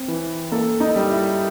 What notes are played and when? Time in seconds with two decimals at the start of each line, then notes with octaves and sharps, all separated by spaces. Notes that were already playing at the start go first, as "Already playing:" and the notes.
Already playing: C4
0.08 E3
0.52 A#3 A4
0.80 D#4
0.96 G3
1.10 E4